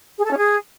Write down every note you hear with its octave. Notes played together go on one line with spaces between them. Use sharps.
G#4
A4
C#4
G#4